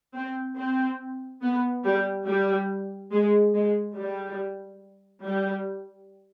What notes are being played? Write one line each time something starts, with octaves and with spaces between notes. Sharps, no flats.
C4
C4
B3
G3
G3
G#3
G#3
G3
G3